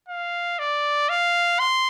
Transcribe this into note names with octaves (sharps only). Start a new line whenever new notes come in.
F5
D5
F5
C6